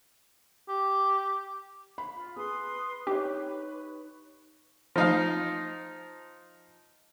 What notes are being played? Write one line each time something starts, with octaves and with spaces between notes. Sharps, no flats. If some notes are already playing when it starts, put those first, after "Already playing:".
G4
B5
F4
G#4 B4 C6 D#6
D#4 G4 B4 C#5
F3 D#4 F5